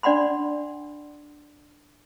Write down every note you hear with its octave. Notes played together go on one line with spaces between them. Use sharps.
D4 D5 F#5 B5 C6